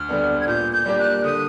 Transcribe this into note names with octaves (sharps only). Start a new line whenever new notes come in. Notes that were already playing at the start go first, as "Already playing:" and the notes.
Already playing: D2 F6
D3 G3 B3 D4
G#6
A#2 G6
G6
G3 A#3 D4 G4
F#6
D3 D#6